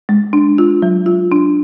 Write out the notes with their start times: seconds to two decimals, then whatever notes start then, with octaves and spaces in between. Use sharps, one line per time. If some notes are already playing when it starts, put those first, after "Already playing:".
0.09 G#3
0.33 D4
0.58 F4
0.82 F#3
1.06 F4
1.32 D4